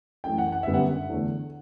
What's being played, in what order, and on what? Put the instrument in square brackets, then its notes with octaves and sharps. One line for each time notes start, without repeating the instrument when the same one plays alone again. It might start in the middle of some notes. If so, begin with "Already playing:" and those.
[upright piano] F#2 E3 A3 G5
F#5
F#5
G1 F#2 C#3 G3 B3 E5
F#5
E2 D3 A3